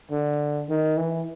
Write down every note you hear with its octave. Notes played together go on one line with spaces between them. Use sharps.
D3
D#3
E3